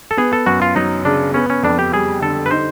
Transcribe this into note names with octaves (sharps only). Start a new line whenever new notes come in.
A4
B3 G#4
A4
F#2 F#4
F4
F#3 D#4
C#3 D4
B3 C#4
C#4
F2 D4
G4
G3 G#4
D3 A4
B4
D#4 C5